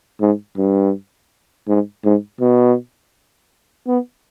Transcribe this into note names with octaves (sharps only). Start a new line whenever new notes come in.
G#2
G2
G#2
G#2
B2
B3